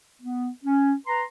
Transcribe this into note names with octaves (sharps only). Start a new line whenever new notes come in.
B3
C#4
B4 A#5 C6